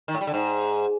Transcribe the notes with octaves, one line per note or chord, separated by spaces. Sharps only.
D#3
A2
G3
D3
G#2